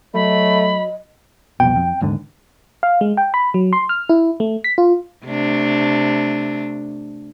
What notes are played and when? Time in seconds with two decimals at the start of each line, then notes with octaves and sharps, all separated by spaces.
0.14 F#3 A3 D#5 B5
1.60 C2 F2 B2 G5
1.76 F2
2.01 D#2 G#2 D3
2.83 F5
3.01 G#3
3.17 G5
3.34 B5
3.54 F#3
3.73 C6
3.89 F6
4.09 E4
4.40 A3
4.64 B6
4.78 F4
5.26 C3 A3 D4